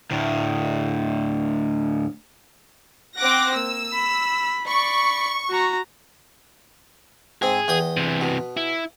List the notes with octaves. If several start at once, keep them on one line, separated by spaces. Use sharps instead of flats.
D2 A2
C4 F#5 D6 F#6 A#6
A#3 E6
B5
D5 B5 C#6
F#4 A#5
G#2 C4 G#4
E2 G5 D#6
C3 E3
B2
E4